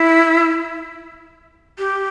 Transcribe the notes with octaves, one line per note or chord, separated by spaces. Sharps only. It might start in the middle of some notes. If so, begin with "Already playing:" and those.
Already playing: E4
G4